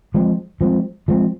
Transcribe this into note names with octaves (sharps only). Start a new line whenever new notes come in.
F3 G#3 C4
F3 G#3 C4
F3 G#3 C4